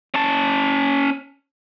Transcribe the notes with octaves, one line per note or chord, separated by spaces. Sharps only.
C#4 A5